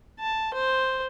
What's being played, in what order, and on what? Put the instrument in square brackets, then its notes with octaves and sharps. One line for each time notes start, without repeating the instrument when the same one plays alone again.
[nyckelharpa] A5
C5